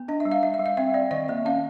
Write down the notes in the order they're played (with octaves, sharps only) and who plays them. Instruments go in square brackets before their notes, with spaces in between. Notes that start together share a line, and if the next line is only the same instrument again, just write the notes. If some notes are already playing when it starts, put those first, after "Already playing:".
Already playing: [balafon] B3
D4 D#5
E5
G3
F5
G3 E5
F5
G3
F5
C4 E5
C4 D5
D#3 D#5
A#3 E5
C#4 F5